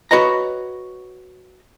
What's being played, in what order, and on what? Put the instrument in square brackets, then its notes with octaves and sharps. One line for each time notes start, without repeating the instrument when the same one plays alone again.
[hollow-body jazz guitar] F#4 B4 C#5 D#5 A#5